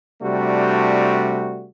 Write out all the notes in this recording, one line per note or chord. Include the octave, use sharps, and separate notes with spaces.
C3 G3 A3 D4 F#4